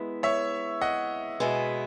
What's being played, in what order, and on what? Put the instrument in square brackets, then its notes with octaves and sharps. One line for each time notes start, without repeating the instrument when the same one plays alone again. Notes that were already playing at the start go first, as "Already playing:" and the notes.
Already playing: [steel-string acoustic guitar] G#3 B3 E4
[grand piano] C#5 E5
D#5 F#5
[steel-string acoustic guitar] B2 G#3 B3 E4